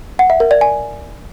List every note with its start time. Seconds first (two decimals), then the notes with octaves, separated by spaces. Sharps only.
0.19 F#5
0.30 E5
0.40 A#4
0.51 D5
0.61 G#5